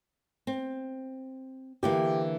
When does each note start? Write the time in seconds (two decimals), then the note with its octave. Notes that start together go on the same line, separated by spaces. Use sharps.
0.47 C4
1.83 D3 E3 A#3 G4